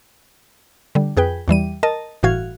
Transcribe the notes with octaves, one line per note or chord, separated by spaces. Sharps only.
D3 G3
F2 G#4 B4 G5
E2 E3 G3 D#7
A#4 D#5 A5
G1 A2 E3 F#4 F5 G#6